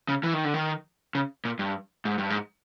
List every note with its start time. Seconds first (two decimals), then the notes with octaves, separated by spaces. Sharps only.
0.09 C#3
0.23 E3
0.34 D#3
0.45 D3
0.54 D#3
1.15 C#3
1.45 A#2
1.59 G2
2.05 G#2
2.18 G2
2.30 G#2